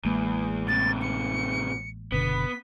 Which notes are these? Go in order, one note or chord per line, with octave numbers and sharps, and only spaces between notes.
A1 E2 G#3 A#3
A2 C3 A6
C#7
F#1 B2 D3 B3 B6